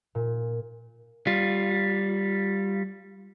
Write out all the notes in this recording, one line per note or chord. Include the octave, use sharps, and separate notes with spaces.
A#2
G3 F4